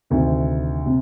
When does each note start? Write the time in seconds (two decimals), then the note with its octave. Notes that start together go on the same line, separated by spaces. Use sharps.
0.10 D2 C3 D#3
0.86 C3